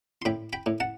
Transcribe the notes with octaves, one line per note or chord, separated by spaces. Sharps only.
C6
A2 G5 B5
G5 B5
A2
F#5 A5